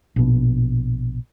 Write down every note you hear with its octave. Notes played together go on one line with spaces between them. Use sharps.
A#1 B2